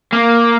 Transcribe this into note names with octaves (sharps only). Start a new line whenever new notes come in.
A#3